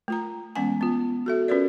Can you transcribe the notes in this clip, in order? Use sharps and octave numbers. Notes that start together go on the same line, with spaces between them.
A3 F4 A#5
E3 G#3 B3 C#4 F#5 G#5
B3 F4
F#4 A4 E5
C#4 F4 F#4 A#4 B4 D5